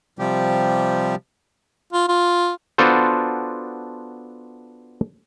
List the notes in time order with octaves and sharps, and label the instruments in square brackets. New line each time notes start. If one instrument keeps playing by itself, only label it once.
[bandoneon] C3 F3 G3 G4
[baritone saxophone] F4
F4
[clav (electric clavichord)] B3 D4 F4 F#4 A4 C5